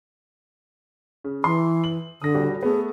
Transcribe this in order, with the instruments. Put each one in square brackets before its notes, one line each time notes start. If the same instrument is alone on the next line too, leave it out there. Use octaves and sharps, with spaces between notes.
[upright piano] C#3
[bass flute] E3 [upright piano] C6
[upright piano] F#7
[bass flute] D3 [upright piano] D#6 A#6
[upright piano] D#1 G3 F#4
[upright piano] A3 B3 [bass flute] G#4